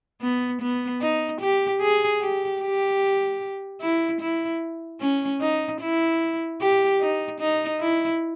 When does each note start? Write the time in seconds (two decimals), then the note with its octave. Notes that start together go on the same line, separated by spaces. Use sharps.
0.22 B3
0.61 B3
1.01 D#4
1.41 G4
1.81 G#4
2.21 G4
2.62 G4
3.81 E4
4.21 E4
5.01 C#4
5.41 D#4
5.81 E4
6.61 G4
7.01 D#4
7.40 D#4
7.80 E4